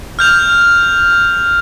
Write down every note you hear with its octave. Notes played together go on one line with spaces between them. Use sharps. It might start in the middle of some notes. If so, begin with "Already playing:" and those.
F6 G6 F7